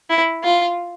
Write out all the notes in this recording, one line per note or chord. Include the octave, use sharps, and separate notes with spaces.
E4
F4